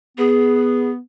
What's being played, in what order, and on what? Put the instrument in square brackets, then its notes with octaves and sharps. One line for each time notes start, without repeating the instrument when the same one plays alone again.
[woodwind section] B3 [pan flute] G#4